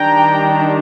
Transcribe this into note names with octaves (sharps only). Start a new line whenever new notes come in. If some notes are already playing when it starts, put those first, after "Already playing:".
Already playing: D#3 G3 D4 G5 A#5